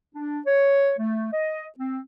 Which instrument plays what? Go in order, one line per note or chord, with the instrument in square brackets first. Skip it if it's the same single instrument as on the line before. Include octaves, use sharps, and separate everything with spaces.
[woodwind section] D4
C#5
A3
D#5
C4